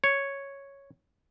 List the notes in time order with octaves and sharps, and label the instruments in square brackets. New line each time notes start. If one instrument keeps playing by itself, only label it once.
[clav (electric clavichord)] C#5